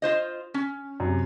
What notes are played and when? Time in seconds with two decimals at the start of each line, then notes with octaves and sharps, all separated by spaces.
0.02 F4 C5 D#5
0.54 C#4
1.00 F#2 C3